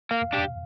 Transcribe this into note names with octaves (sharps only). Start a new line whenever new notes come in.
A#3 F5
D4 G4